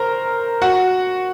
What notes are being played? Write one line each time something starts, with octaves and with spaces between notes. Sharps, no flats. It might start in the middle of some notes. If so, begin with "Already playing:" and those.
Already playing: A#4 C5 A#5
F#4 F#5